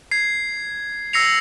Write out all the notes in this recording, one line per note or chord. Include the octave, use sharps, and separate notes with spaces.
G#6 C7
E6 A#6 C7 C#7 F7